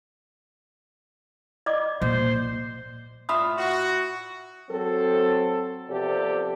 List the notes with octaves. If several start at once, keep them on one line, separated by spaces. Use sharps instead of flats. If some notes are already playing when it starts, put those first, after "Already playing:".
D5 D#5 D6
A#2 C5
A2 F4 E5 B5 D#6
F#4
F#3 C4 A4
C3 F3 B3 G4 A4 D5